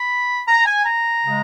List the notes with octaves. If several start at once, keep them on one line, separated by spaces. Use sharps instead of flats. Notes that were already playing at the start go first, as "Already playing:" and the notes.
Already playing: B5
A#5
G#5
A#5
C#3 G#3